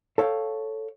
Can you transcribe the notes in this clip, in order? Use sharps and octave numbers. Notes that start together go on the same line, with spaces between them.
A4 C#5 F5 G5